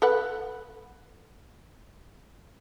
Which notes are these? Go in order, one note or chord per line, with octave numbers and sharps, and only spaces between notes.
A4 B4 F#5